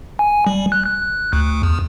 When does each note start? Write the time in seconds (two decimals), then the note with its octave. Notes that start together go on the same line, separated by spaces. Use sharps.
0.19 G#5
0.47 G3
0.72 F#6
0.85 F#6
1.33 D2
1.63 E2